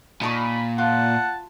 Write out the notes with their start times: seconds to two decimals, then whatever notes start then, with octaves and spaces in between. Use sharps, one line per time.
0.22 A#2 D#4 A5 B5 C#6
0.78 F4 F#5 A5